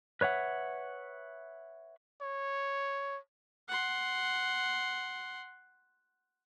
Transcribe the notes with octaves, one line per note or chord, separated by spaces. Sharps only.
B4 C#5 E5 F#5
C#5
F#5 C6